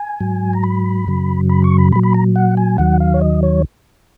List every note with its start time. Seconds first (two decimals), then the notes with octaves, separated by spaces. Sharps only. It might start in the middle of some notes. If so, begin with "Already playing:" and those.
Already playing: G#5
0.21 G#2 F#3
0.53 A#5
0.63 B5
1.07 F#2 C#3 F#3
1.49 B5
1.64 C#6
1.78 B5
1.92 A#2 F#3 B5
2.03 B5
2.14 A#5
2.36 F#5
2.57 G#5
2.78 D#2 D#3 F#3 F#5
3.00 F5
3.14 C#5
3.21 D#5
3.43 C#5